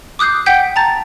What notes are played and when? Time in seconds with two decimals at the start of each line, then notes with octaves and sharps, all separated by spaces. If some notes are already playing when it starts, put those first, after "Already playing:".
0.19 D6 D#6 F#6 G6 C7
0.46 F#5 G5 G6 B6
0.76 A5 A#5 A6